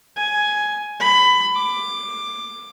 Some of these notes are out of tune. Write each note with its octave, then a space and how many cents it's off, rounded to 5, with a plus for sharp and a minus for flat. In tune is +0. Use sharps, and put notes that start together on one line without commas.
G#5 +10
B5 +20
D6 +15